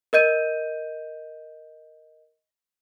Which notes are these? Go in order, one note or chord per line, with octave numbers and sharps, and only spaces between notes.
A#4 D#5 G6 D#7